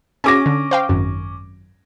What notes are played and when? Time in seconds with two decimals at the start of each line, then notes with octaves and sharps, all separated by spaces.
0.24 C#4 F#4 G#4 G#5 D6 A#6
0.46 D3
0.71 C5 F5 G5
0.89 G#1 F#2